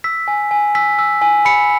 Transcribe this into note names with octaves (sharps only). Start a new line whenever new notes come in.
E6 B6
G#5
G#5
E6 B6
E6
G#5
B5 C#7